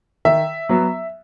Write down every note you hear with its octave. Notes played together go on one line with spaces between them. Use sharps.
D#3 E5
F#3 B3